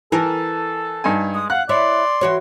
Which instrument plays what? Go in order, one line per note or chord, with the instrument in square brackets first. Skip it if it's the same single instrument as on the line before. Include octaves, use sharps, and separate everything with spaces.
[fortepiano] E3 [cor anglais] A4 [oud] A#4 [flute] A5
[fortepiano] G2 D#4 G#5
[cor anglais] G#3 [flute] D#6
[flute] F5 [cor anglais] F#5 [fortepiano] F#6
[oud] E4 C#5 E5 [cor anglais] D5 [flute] C6
[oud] E3 F#4 C#5